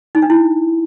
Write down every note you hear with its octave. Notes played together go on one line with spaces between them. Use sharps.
D#4
D4
E4